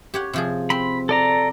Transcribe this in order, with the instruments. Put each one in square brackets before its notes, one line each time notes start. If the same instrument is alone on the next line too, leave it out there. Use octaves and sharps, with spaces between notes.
[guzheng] G4 C#5 F#5
C3 F3 G#4
[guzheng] C4 [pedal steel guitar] B5
[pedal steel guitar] A4 D5 A#5